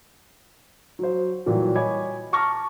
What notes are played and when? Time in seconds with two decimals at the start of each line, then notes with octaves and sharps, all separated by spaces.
0.99 F#3 C5
1.46 A#2 E3 F#3 G3
1.75 C#5 D#5 G#5 B5 D6 G#6
2.33 A5 A#5 C#6 D6 F6 A#6